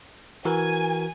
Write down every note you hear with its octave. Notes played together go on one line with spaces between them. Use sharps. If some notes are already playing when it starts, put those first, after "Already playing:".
E3 F#4 A#4 G#5